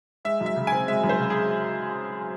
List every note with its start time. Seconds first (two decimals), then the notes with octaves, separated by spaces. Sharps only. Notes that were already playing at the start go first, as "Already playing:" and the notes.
0.25 G#3 E5
0.41 F#2
0.46 E5
0.56 C#3
0.67 C4 G#5
0.88 G#3 E5
1.03 F#2
1.09 C5
1.20 C#3
1.30 G#4